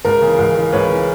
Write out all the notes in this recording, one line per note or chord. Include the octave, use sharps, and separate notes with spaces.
C#2 A#4
C#3 E3
C#2
C#3 E3
C#2 B4 C#5
C#3 E3